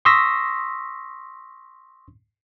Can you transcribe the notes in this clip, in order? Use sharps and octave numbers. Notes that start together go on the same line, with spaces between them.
C6 C#6 D#6 E6 A#6 B6